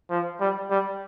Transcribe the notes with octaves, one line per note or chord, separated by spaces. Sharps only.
F3
G3
G3